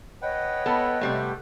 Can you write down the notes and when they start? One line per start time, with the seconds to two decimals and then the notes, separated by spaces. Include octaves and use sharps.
0.22 B4 C#5 D#5 F#5 G5
0.66 B3 A4 A5
1.01 C3 G3 A3